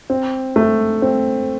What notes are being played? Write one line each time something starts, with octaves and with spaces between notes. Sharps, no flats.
C4
A3
C4